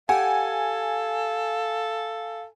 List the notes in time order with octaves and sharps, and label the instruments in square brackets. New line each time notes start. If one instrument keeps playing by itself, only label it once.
[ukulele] G4 F#5 [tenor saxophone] A4 [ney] F5 [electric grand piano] G#5